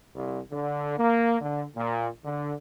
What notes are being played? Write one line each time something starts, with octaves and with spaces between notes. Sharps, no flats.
C2
D3
A#3
D3
A#2
D3